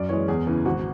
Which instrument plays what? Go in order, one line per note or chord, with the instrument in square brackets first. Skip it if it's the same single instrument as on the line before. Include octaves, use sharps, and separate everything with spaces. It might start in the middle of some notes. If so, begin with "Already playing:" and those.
Already playing: [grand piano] F#2 D5
E3 G#3 C#5
E2 G#4
C#3 E3
G#1 F#4